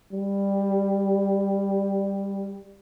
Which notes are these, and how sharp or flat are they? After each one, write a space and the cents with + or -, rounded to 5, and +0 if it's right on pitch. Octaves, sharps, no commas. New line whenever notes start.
G3 +10